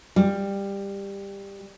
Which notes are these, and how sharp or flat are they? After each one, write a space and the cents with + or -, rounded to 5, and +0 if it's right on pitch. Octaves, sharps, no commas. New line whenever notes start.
G3 +15